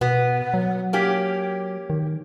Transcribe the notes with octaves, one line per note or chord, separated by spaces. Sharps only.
B2 B3
F#3
A#3 C#4 G4
D#3